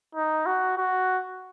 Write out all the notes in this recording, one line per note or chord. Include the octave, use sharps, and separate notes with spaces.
D#4
F#4
F#4